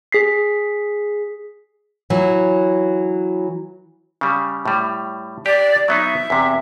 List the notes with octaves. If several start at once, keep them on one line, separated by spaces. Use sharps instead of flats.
G#4 B6 C7
E3 F#3
C#3 G3
A2 G3
G4 D5
F#3 B3 D#4 E5
E2 C3